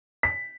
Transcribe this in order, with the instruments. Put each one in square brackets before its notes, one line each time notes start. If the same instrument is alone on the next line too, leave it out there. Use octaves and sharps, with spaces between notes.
[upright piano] B6